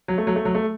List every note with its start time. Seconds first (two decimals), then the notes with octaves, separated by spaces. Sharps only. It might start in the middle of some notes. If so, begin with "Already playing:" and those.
0.08 F#3
0.18 A3
0.27 F#3
0.36 A3
0.45 F#3
0.55 A3